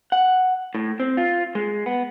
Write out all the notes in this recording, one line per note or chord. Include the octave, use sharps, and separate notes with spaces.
F#5
A2
C4
F4
G#3
B3